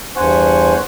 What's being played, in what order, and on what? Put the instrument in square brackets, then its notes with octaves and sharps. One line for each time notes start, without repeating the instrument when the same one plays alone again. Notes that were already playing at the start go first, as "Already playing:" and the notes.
[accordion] E2 G2 C5 F#5 G#5 C#6